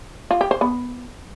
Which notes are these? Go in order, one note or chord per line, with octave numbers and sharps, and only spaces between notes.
F4
G4
C5
B3